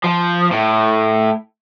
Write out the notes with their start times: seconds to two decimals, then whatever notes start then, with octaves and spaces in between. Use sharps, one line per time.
0.04 F3
0.51 A2